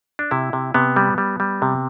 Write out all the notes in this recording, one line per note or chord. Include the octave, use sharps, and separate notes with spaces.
D4
C3 E4
C3
C3 B3
G3
G3
G3
C3